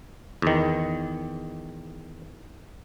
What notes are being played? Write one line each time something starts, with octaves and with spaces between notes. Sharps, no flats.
E2 D#3